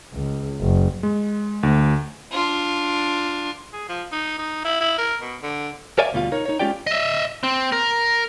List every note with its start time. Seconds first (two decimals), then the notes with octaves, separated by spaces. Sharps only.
0.13 C#2
0.60 F#1
1.03 G#3
1.63 D2
2.32 D4 F4
3.73 G#4
3.89 F3
4.12 D#4
4.38 D#4
4.64 E4
4.81 E4
4.98 A#4
5.21 B2
5.42 D3
5.98 A#4 C#5 D5 E5 F5 G#5
6.13 D2 B2 G3 F4 F5
6.32 D#4 A#4 C#5
6.46 D#4 C#5
6.59 G#3 C#4 F4 G4 D5 G5
6.87 D#5 E5
7.43 C4
7.72 A#4